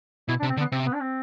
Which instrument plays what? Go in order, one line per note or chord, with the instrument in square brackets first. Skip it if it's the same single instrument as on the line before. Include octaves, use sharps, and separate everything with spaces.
[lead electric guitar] B2 [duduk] E4
[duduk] D4
[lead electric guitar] C3
[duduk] C4
[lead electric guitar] D3
[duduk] B3
[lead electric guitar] C3 [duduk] C4
[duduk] B3
D4
C4